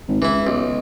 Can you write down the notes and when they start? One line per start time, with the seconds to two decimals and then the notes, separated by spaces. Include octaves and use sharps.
0.08 G#1
0.22 C#2 E3 E4
0.47 B1